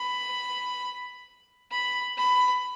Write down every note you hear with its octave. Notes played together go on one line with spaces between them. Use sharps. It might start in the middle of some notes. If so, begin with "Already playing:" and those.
Already playing: B5
B5
B5